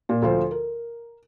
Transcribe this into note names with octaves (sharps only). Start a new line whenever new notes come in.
A#2
D2 F3 C5
A#4